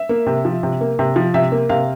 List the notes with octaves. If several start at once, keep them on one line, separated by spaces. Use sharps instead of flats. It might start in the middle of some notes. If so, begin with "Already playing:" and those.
Already playing: E5
A#3
C3
F3
C3
A#3
C3
F3
C3 E5
A#3
C3 F5